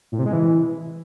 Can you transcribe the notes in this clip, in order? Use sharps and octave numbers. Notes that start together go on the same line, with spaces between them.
A2
C3
G#3
E3